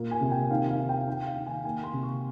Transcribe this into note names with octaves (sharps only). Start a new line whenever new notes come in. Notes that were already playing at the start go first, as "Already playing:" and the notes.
Already playing: A#2 A#3
G#5
C3
G5
D#3 F5
F5
D#3
G5
D#3 G5
F5
D#3
G#5
A#3 G#5
C6
C3
C#6